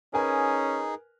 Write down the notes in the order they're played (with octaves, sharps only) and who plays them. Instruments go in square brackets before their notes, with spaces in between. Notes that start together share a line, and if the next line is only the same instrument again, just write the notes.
[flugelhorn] C#4 [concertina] D#4 G#4 [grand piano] A#4 B4 G#5